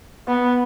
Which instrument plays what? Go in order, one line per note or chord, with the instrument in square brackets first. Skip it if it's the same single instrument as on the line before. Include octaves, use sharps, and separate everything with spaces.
[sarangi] B3